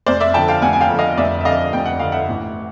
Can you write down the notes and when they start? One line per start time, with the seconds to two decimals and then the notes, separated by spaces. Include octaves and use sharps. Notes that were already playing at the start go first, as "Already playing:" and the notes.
0.06 F1 C5 D5
0.20 D5 E5
0.34 F2 D3 G5 A5
0.48 F5 G5
0.62 F1 F#5 G#5
0.73 G#5
0.81 F5 G5
0.90 F2 D3
0.99 D#5 F5
1.18 F1 D5 E5
1.41 E5
1.45 F2 D3 D#5 F5
1.73 F1 G5
1.86 F#5
1.99 F2 D3 F5
2.12 E5 F#5
2.29 A1